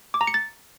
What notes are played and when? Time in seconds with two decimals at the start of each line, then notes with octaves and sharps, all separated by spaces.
0.14 D6
0.21 A#5
0.27 C#7
0.34 A6